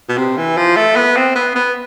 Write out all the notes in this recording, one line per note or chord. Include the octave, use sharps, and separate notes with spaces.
B2
C3
E3
F3
A3
B3
C4
B3
B3